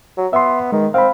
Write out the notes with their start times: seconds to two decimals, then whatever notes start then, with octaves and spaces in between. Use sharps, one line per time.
0.17 F#3
0.33 B3 E5 C6
0.72 D#3 G#3
0.94 C4 F5 B5